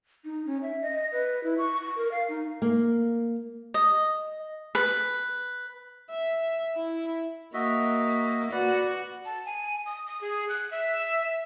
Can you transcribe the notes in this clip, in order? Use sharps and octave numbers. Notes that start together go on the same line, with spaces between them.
D#4
C#4
E5
D#5
B4
E4
C#6
A#4
F5
D#4
A#3
D#5
B4
E5
E4
A#3 F#4 D#5 E5
F#4 B4 D5
A5
G#5
D#6
D#6
G#4
F#6
E5